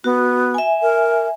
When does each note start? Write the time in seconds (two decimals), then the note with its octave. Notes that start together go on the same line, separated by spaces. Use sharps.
0.04 B3 F#4
0.54 E5 G#5
0.82 A#4